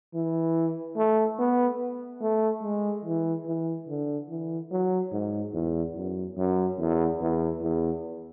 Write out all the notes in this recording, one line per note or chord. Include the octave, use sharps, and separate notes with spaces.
E3
A3
B3
A3
G#3
E3
E3
D3
E3
F#3
G#2
E2
F#2
F#2
E2
E2
E2